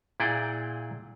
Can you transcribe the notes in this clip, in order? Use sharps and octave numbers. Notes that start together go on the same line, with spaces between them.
A#2 E4 G#4 D5 F#5 G5